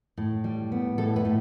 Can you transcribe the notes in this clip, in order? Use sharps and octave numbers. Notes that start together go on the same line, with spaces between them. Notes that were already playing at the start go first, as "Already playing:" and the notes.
A2
G3
B3
A2 A4
B4
A2